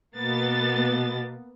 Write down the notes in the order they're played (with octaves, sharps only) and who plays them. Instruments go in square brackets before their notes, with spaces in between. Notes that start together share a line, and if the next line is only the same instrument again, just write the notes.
[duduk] B2 [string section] A#3 B3 A6